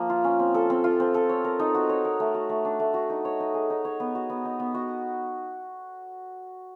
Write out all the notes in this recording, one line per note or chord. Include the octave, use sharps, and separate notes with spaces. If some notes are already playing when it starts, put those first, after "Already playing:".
Already playing: F3 A#3
F4
C#4
C4
A4
C4
F4
C4
A4
C#5
A#4
D#4
F#4
C#5
A#4
A3
F#4
A3
D4
A3
F#4
D#4
C#5
D#4
G#4
D#4
C#5
B3
F#4
B3
D#4
B3
F#4